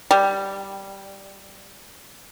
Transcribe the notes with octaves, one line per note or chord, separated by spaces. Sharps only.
G3